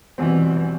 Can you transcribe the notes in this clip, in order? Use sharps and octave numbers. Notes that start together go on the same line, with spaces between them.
F1 E2 B2 E3 G3 C4